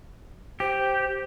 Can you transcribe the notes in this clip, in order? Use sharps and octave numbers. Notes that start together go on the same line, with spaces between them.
G4 C5